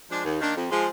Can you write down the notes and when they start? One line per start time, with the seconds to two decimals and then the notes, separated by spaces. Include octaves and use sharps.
0.09 F3 G#3 D4
0.24 D#2
0.40 D#3 A#3 D4
0.56 F2
0.71 F3 G#3